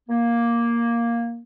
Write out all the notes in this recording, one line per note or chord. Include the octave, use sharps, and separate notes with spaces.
A#3